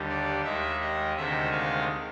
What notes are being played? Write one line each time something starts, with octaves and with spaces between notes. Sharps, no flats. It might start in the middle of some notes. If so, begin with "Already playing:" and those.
Already playing: D#2 D3 G3
D5
D#2 D#3 G#3 E5
D#5
D2 C3 D#3 G#3 E5
F5